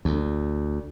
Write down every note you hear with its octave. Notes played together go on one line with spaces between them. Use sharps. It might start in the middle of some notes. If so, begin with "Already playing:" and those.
D2